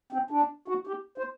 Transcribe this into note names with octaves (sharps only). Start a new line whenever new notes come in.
C4
D4
F#4
G4
C5